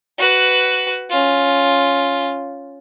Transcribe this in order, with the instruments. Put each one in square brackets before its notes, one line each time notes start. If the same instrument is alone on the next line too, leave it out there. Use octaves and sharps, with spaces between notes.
[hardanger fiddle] F#4 B4
C#4 F4